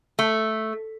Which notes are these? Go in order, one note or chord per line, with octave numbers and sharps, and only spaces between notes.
A3